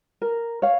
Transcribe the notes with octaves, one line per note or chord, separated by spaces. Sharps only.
A#4
C#5 F5